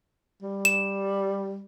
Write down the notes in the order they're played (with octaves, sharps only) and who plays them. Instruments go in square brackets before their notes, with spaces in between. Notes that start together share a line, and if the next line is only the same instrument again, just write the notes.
[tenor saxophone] G3
[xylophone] E7